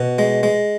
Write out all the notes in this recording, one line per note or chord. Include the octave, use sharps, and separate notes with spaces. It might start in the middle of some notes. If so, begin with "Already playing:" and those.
Already playing: B2
G#3
G#3